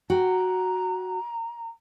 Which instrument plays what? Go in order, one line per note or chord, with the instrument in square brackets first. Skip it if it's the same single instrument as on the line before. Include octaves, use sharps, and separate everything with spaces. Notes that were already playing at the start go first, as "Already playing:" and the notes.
[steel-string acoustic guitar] F#4 G5 [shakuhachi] A#5